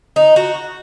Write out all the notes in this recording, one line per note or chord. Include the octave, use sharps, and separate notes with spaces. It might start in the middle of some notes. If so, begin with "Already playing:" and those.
D#4
F#4